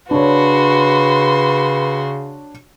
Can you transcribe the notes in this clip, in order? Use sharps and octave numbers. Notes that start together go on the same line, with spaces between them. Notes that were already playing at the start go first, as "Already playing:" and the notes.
C#3 D4 F#4 B4 C#5 C6